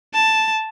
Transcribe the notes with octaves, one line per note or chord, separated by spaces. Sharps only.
A5